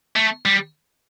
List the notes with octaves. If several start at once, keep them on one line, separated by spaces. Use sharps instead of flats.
A3
G3